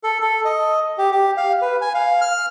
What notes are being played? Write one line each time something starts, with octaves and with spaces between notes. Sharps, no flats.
A4
A4
D#5
G4
G4
F5
B4
G#5
F5
F6